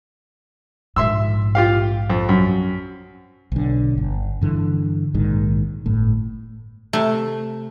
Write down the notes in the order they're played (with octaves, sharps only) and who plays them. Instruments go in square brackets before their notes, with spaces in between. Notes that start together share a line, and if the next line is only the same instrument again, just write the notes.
[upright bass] A#1 G#2 [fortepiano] E5 C6 E6
[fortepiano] F4 G4 F5
F2
F#2
[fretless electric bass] B1 D3
G1
G2 D3 E3
A#1 G#2 D#3
G1 A2
[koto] C3 A3